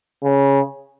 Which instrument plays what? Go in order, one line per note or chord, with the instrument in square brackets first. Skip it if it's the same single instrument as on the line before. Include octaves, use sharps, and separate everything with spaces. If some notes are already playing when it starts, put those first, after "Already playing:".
[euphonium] C#3